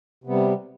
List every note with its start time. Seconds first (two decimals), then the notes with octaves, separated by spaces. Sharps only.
0.24 C3
0.26 B3
0.29 G3